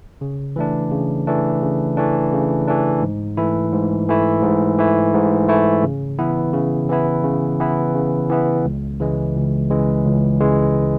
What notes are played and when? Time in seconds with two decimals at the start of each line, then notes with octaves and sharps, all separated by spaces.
0.21 C#3
0.56 E3 A3 D4
0.91 C#3
1.27 E3 A3 D4
1.62 C#3
1.97 E3 A3 D4
2.33 C#3
2.67 E3 A3 D4
3.02 G#2
3.37 E3 A3 E4
3.73 G#2
4.09 E3 A3 E4
4.43 G#2
4.79 E3 A3 E4
5.14 G#2
5.48 E3 A3 E4
5.83 C#3
6.19 E3 B3 E4
6.53 C#3
6.90 E3 B3 E4
7.24 C#3
7.60 E3 B3 E4
7.95 C#3
8.29 E3 B3 E4
8.65 C#2
9.00 C#3 E3 G#3
9.36 C#2
9.70 C#3 E3 G#3
10.05 C#2
10.40 C#3 E3 G#3